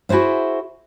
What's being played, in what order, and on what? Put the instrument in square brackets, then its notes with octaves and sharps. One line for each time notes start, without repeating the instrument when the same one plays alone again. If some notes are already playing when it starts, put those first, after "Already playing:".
[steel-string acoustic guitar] E4 F#4 G#4 C5 E5